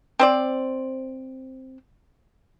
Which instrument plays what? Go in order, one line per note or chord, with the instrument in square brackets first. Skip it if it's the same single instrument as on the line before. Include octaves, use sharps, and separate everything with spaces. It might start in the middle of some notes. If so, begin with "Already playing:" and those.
[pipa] C4 C5 D5